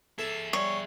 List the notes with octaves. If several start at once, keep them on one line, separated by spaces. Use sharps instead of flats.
G#4 A4 E5
G3 C#5